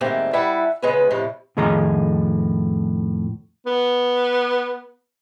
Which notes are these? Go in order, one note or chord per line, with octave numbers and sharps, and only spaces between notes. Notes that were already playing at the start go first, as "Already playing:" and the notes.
G#2 D3 G3 A3 A#3 C4
G3 E4 E5 F#5 A5
C#3 G#3 B3 G#4 B4
F2 A2 C3 F3
F2 A2 D#3 G#4 D#5 A#5
B3